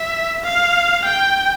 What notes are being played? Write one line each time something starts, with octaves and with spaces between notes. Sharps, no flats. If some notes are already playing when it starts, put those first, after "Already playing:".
Already playing: E5
F5
G5